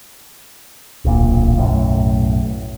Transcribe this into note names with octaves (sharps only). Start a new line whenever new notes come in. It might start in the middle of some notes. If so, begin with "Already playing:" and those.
D1 B1 A#2
B1 F#2 A2